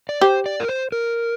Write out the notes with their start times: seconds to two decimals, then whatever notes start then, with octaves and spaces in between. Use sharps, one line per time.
0.09 D5
0.21 G4 C5
0.46 D5
0.60 A#4
0.69 C5
0.92 A#4